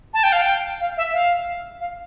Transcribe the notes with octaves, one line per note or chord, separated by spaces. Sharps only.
A5
G5
F5
G5
F5
E5
F5
F5